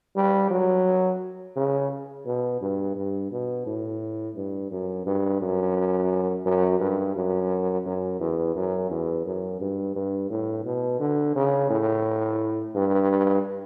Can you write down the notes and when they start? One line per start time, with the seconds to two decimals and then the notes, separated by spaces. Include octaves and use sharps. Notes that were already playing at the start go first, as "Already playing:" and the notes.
0.17 G3
0.50 F#3
1.57 C#3
2.26 B2
2.61 G2
2.96 G2
3.31 B2
3.66 A2
4.36 G2
4.71 F#2
5.06 G2
5.41 F#2
6.46 F#2
6.80 G2
7.15 F#2
7.86 F#2
8.20 E2
8.56 F#2
8.91 E2
9.26 F#2
9.61 G2
9.95 G2
10.30 A2
10.65 B2
11.00 D3
11.36 C#3
11.70 A2
12.75 G2